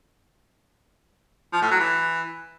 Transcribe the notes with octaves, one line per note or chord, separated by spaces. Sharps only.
F3
A2
F#3
E3